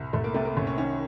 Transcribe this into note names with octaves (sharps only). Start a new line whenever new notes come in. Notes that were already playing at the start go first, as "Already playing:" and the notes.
Already playing: C2
C2 A3
A#3
C3 A3
A#3
C2 C#4
C#4
D#3 C#4